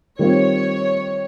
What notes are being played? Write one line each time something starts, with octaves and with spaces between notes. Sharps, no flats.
D#3 G3 C4 F4 C#5